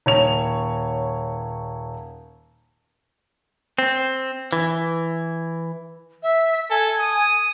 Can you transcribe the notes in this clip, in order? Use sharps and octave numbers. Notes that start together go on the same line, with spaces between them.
D#1 C#5 F7
C4
E3
E5
A4 G#5
D#6